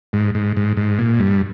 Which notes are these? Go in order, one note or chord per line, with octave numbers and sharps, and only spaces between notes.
G#2
G#2
G#2
G#2
A#2
G2